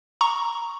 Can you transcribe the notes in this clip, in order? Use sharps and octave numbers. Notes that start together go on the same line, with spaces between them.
A#5 C#6